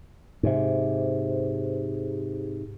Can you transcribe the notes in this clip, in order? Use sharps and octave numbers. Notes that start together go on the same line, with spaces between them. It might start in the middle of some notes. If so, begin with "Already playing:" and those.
G#2 C3